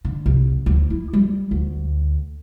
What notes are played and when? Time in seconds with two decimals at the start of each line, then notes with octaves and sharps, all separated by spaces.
0.05 D3
0.26 C2
0.66 D2
0.90 E4
1.13 G3
1.51 D2